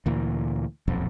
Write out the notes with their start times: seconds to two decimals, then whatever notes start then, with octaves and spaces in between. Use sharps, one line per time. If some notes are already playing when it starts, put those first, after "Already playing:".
0.06 D2 A#2 E3
0.88 D#1 B1 F2